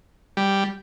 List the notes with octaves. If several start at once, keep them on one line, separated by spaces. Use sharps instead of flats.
G3